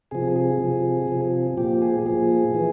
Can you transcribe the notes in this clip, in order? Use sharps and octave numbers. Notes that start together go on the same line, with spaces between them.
C3 F3 G#4
G#4
C3 F3
C3 F3
A#2 F3 G4
G#4
A#2 F3 G#4
E3